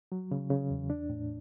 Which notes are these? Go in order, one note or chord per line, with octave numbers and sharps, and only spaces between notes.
F#3
C#3
C#3
E2
D4
A2